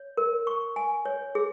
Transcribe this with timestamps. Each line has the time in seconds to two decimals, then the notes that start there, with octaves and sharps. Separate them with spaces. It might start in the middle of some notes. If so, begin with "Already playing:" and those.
Already playing: C#5
0.17 A#4
0.47 C#6
0.76 G#5
1.05 C#5
1.35 G#4